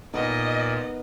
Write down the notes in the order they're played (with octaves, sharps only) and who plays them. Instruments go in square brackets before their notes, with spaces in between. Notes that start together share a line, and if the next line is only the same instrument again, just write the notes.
[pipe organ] A#2 [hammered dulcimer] D#3 B3 A#4 [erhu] D#5